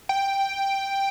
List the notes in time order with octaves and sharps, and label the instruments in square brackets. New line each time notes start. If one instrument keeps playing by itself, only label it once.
[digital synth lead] G5